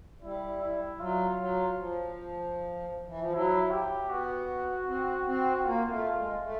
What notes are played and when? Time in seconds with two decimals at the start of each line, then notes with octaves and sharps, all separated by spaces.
0.22 G3 E4
0.61 E4
1.00 F#3 F4
1.38 F#3
1.78 F3
3.07 E3
3.20 F3
3.32 F#3 E4
3.71 G4
4.10 B3 F#4
4.87 C4
5.26 C4
5.65 A#3 F4
5.91 A3
6.16 G#3
6.42 A3